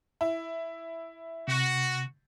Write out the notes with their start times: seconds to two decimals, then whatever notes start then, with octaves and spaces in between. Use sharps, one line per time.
0.21 E4
1.48 C3 F#4